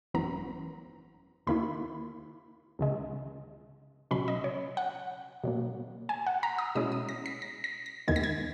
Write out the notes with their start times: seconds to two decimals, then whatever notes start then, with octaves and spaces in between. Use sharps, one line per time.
0.14 G#1 F#2 E3 B3 A#5
1.47 D#2 D#3 A#3 E4 B5
2.79 C#2 C#3 G#3
4.11 C#2 B2 F#3 C#4 B5
4.28 D#5
4.44 C#5
4.77 F#5
5.44 B2 F#3 A#3
6.09 G#5
6.27 F#5
6.43 A#5
6.59 D#6
6.75 B2 G#3 C#4 E4 D#6
6.92 D#6
7.09 A#6
7.26 B6
7.42 A#6
7.64 A#6
7.86 A#6
8.08 D#2 D#3 G#3 B3 E4 G#6
8.16 A#6
8.24 G#6